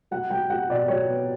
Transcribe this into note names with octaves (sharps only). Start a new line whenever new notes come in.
F#3 F#5
F#3 G5
F#3 F#5
B2 D5
F#3 C#5
B3